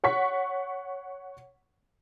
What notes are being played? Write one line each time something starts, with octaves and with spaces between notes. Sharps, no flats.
C#5 F#5 C#6 B6